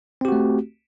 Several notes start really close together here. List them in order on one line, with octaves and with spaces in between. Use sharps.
C4 G4 F#4 A3